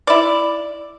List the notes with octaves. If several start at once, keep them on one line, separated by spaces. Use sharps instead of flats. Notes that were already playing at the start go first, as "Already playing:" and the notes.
E4 D5